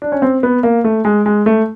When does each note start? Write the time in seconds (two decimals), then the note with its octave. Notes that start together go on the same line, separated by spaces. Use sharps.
0.02 D4
0.12 C#4
0.22 C4
0.43 B3
0.63 A#3
0.84 A3
1.05 G#3
1.26 G#3
1.46 A3